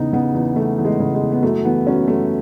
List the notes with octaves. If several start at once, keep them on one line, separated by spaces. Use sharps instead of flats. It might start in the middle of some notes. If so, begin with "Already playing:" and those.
Already playing: E2 C#3 B3 D#4
C#3 B3
E2 B3
E2 A3
E2
G#3
C#3
G#3
E2
B3
F#2 A3
E3 B3
F#2 C#4
F#2 A3